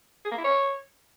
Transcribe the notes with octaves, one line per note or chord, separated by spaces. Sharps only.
G#4
A#3
E4
C#5